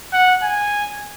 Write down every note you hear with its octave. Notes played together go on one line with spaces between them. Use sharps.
F#5
G#5